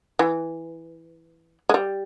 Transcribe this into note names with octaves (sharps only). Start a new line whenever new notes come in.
E3
G#3
G3